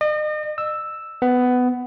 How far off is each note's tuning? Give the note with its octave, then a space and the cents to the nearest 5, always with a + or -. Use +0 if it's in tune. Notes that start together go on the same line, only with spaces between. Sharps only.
D#5 -40
E6 +0
B3 +15